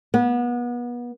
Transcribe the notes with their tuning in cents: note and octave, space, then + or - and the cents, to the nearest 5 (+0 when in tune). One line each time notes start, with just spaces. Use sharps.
B3 -30